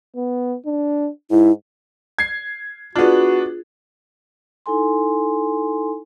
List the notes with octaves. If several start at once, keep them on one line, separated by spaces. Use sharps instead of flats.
B3
D4
G#2 E4
G#6 C7
B3 D4 F4 F#4 G#4
D#4 E4 A4 G#5 C6